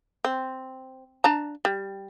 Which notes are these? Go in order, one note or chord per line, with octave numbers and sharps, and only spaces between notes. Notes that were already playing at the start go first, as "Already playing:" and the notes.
C4
D4 A5 A#5
G3